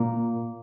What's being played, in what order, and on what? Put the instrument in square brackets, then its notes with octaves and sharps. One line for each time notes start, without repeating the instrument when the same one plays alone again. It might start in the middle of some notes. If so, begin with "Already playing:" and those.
Already playing: [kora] A#2 A#3